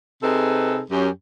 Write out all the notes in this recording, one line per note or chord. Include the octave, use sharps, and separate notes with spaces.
C3 C4 D#4 G#4 A4 B4
F#2 C#4 G4